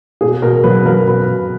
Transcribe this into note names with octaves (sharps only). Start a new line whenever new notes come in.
B2 G#4
B2 A#4
F#3 B4
F#3 A#4
B2 B4
B2